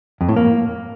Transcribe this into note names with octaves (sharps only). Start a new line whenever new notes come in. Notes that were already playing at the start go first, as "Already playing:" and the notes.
F2
A2
A#3